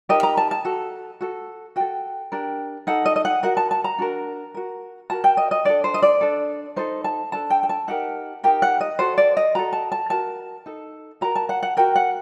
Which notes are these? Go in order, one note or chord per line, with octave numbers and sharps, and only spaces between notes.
D#4 G4 A#4 D#5
A#5
A5
A5
F#4 A4
F#4 A4
F#4 A4 G5
D4 G4 A#4
D#4 A4 F#5
D#5
D#5
F#5
F#4 A#4 F#5
A5
A5
A#5
D4 F#4 A#4
F#4 A#4
F#4 A#4 A5
G5
D#5
D#5
D4 A4 D5
C5
D#5
D5
D4 A4
D#4 A4 C5
A5
D4 A4 A5
G5
G5
A5
D#4 G4 A#4 F#5
D#4 G4 A#4 G5
F#5
D#5
F#4 A4 C5
D5
D#5
F#4 A4 A#5
A5
A5
F#4 A#4 A5
D#4 A4
F#4 A#4 A#5
A5
F#5
F#5
F#4 A#4 G5
F#5